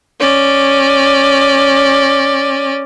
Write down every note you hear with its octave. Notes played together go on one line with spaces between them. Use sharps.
C#4 D5